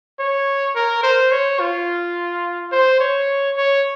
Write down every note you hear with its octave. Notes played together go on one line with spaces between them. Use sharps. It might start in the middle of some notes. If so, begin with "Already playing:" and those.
C#5
A#4
C5
C#5
F4
C5
C#5
C#5